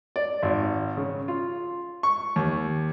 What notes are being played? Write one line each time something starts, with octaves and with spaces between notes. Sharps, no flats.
D5
G#1
C#3
F4
C#6
D#2